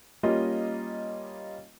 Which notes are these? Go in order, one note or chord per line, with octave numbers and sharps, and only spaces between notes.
G3 A#3 C#4 F4 D#5